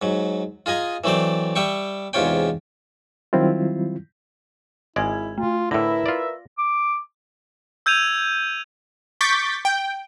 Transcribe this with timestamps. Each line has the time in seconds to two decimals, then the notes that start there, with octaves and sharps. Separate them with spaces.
0.02 G#2 F#3
0.66 F4 G#4 D#5 G#5 A#5
1.04 E3 F#3 A3 C4 C5 D5
1.56 G3 E5 G5 C#6
2.13 E2 G#2 C3 F4 C#5 G5
3.33 D#3 F#3 G3 C4 E4 F4
4.96 G#1 G#3 E4 D5 G#5 G#6
5.38 A3 F4
5.71 A2 D3 E4 A#4 B4 E5 A#6
6.06 F4 D5
6.58 D6
7.86 E6 G6 G#6 D#7 F7
9.21 C#6 D6 G6 A6 B6
9.65 G5